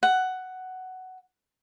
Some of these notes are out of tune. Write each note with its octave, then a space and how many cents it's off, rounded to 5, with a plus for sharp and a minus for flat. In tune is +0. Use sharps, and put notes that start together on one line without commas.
F#5 +10